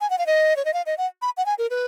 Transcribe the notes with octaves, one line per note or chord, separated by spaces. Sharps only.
G#5
F#5
F5
D#5
C#5
D#5
F5
D#5
F#5
B5
F#5
G#5
A#4
B4